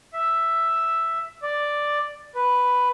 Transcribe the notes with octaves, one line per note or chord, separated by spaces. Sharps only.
E5
D5
B4